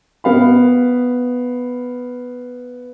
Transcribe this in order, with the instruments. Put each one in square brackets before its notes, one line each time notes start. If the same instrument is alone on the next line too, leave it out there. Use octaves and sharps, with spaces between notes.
[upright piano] B3 F5 B5